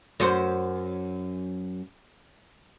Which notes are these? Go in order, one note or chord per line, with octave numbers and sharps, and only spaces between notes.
F#2 F#4 C5